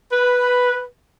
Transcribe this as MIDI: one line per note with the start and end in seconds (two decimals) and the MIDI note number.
0.12 0.82 71